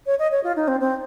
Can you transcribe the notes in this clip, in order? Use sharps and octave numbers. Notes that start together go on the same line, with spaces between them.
C#5
D#5
C#5
F4
D#4
C4
C4